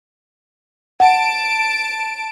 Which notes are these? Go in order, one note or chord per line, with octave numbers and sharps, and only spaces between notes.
F#5 A5 D7